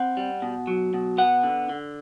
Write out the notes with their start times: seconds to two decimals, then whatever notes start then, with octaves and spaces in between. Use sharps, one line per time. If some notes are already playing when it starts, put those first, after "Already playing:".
Already playing: C4 F#5
0.17 G3
0.42 B2
0.67 F#3
0.94 B2
1.18 B3 F#5
1.43 D3
1.69 D3